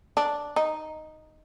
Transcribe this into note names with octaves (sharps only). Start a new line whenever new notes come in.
D4
D#4